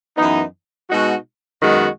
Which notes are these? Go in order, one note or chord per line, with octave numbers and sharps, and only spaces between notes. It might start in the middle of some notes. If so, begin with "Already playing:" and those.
F#2 E3 B3 D#4
B2 G#3 D#4 F#4
F#2 D#3 G#3 B3 F#4